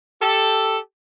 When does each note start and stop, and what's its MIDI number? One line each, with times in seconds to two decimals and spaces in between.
0.22 0.77 67
0.22 0.77 69